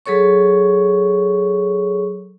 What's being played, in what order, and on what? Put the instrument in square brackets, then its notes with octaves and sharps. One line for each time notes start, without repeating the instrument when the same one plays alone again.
[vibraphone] F#3 G#4 A4 C#5 C#6